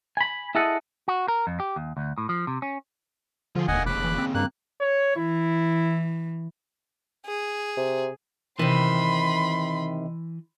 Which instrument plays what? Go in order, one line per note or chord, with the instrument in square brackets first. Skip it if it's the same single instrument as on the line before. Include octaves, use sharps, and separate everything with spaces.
[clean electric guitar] G#5 B5
E4 G#4 A4 D#5 F#5
F#4
A#4
F2
G4
D#2
D2
A2
F3
C3
C#4
[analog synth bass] D3 [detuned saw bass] F3 [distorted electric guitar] F4 G#4
[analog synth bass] E1 [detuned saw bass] D#2 [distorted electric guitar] D3 A#3 [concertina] D#5 F#5 G#5
[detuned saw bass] F1 [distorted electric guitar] D#2 C#3 [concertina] B5 D6 F#6
[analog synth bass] E3
C4
[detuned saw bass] G2 [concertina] A#3 F#6
[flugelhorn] C#5
[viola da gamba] E3 [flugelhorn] E4
[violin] G#4
[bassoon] C3
[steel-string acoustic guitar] C3 D#3 [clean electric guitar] E3 [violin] B5 C6